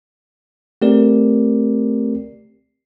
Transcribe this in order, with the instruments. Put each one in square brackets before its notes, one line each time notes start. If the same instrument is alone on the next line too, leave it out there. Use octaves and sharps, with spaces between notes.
[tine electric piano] A3 C4 G4 A#4 D5